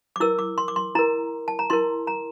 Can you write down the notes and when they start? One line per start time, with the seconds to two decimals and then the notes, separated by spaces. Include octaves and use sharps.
0.16 D6
0.20 E4 A#4 E6
0.39 D6
0.58 C6
0.68 D6
0.76 C6
0.95 E4 A#4 A#5
1.48 A5
1.59 A#5
1.70 E4 A#4 C6
2.07 A#5